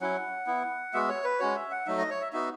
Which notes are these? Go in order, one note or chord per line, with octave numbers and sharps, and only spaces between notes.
F#3 C#4 E4 F#5
B3 E4
G#3 B3 F#4 E5
C#5
B4
G#3 C#4 F#4 C#5
E5
F#5
F#3 A3 D#4 E5
D#5
C#5
E5
B3 D#4 F#4 E5